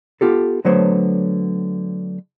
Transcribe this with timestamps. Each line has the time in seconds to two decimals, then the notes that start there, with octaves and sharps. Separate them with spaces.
0.21 B3 F4 G4 A4
0.65 D3 F#3 A3 B3 C5 C#5